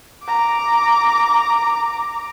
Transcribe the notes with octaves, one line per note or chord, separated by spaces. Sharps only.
A#5 D6